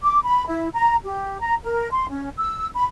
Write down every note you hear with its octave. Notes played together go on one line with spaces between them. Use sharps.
D6
B5
E4
A#5
G4
A#5
A#4
C6
C#4
E6
B5